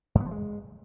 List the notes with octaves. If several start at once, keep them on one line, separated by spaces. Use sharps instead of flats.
G2
B3
F3
G#3